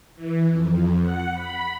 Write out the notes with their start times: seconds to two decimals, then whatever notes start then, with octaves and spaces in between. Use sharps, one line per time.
0.15 E3
0.51 F2
0.99 F#5
1.33 B5